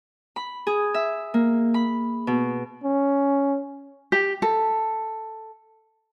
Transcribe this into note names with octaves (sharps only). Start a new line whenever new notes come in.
B5
G#4
E5
A#3
B5
B2
C#4
G4
A4